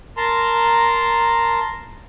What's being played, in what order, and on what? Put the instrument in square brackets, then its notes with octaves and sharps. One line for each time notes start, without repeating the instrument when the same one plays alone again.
[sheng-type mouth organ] A#4 A5 A#5 C6